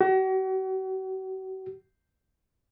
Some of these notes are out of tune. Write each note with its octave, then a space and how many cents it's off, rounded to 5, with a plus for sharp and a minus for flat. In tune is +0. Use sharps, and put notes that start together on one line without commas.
F#4 +40